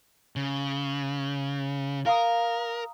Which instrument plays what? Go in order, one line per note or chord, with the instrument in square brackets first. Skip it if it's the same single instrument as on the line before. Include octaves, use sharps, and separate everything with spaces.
[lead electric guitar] C#3
[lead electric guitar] A#4 [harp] F5 A#5 D#6